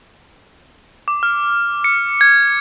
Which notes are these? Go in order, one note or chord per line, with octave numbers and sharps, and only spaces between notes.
D6
F6
C#7
G#6